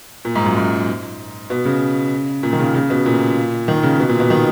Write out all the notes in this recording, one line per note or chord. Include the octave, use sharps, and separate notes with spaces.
A#2
G#2
F#2
F#2
B2
C#3
A#2
D#3
C#3
C#3
B2
A#2
D#3
C#3
B2
A#2
B2
D#3